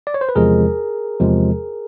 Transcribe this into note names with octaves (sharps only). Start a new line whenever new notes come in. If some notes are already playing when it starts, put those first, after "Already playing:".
D5
C#5
C5
B4
E2 C3 F3 G#3 G#4 A#4
E2 C3 F3 G#3